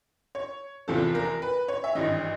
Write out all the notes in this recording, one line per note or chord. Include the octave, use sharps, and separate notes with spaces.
C#5
F1 E2 C3 F3 A4
A#4
B4
C#5
E5
G#1 G2 E3 D#5